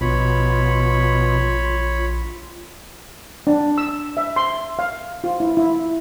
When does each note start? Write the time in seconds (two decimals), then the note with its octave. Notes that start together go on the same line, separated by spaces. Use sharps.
0.01 A#1 B2 F4 C#5 B5
3.47 D4
3.78 E6
4.17 E5
4.36 C6
4.79 F5
5.24 F4
5.40 E4
5.57 E4